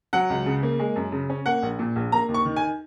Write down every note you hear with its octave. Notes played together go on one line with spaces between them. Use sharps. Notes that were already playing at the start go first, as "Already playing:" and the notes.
F#3 F#5
C#2
C#3
A#3
G#3
F#2
C#3
C#4
A#3 F#5
A#1
A#2
A#1
A#3 A#5
D#2
C#6
D#3
G#5